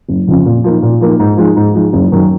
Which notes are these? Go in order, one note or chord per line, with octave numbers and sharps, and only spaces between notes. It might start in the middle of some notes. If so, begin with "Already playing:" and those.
F#1
F2 C#3 F3
A#2
F3 A#3 D#4
A#2
F3 A#3 D#4
G#2
F3 G#3 D#4
G#2
F3 G#3 D#4
F#1
F#2 D#3 F#3